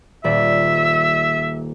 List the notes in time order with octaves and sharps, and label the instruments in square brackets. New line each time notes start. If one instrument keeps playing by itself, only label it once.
[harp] D#1 D5 [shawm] E5